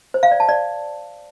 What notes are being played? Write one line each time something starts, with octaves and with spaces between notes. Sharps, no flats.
C5
F5
D5
A5
D5